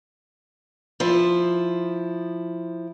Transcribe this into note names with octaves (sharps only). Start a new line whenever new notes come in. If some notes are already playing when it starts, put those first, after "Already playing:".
F3 E4